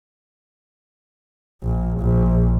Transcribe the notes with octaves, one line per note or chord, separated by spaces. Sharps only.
A#1
A#1